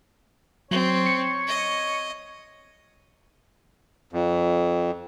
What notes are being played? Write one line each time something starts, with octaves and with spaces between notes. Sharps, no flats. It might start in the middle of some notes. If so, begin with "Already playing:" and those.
F#3 C4 C#5
C#7
D#5
F2